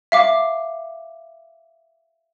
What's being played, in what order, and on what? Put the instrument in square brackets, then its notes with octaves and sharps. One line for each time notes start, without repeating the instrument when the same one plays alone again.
[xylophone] E5 F5 D6